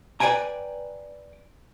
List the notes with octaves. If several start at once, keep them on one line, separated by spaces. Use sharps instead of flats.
B4 D5 F5 G5 G#5 A#5